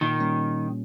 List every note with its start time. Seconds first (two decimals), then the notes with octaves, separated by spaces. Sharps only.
0.01 A#2 D#3
0.20 G3 A#3 C#4